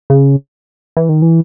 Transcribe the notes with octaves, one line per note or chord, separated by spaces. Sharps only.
C#3
E3
D#3
E3